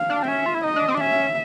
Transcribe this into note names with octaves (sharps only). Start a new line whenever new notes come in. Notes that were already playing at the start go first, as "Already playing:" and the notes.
Already playing: F5
D4
C4
C#4 E5
F4
E4
D#4 D#5
D4
C4
D4
C#4 E5